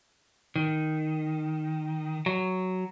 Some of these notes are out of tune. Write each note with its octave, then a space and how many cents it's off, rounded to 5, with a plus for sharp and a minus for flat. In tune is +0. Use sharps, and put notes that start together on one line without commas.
D#3 +0
F#3 +5